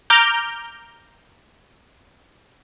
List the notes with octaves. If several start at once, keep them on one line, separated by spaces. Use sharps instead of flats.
A#5 D6 F6 G6